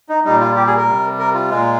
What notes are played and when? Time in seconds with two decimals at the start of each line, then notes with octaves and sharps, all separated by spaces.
0.09 D#4
0.25 A#2 G3 D#4
0.41 F4
0.56 G4
0.67 G#4
0.77 A#4
0.87 C3 G3
1.19 A#4
1.34 F4
1.51 A#2 G#3